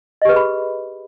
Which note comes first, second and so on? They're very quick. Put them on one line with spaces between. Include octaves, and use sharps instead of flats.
D#5 G4 B4 G#4 B5